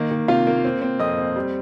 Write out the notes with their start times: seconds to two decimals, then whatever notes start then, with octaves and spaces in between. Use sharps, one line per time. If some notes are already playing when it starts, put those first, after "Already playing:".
Already playing: D#3 A#3
0.11 D#3
0.28 C3 F4 F5
0.47 A#3
0.64 C4
0.82 C4
0.99 F2 D#5 D#6
1.18 C4
1.36 G3